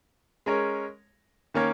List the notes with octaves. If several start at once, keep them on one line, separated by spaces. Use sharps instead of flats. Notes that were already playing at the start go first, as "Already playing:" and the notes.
G#3 C#4 A#4 C#5
D#3 A#3 C#4 A#4 C#5